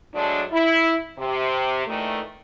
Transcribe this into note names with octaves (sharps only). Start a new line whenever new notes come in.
F#3 G#3 A3 D4
E4
C3
A#2 D#3 E3 A3